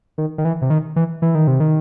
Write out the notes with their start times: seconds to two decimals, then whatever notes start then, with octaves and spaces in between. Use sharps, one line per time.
0.18 D#3
0.38 D#3
0.45 E3
0.62 C3
0.70 D#3
0.96 E3
1.22 E3
1.35 D#3
1.47 C3
1.60 D#3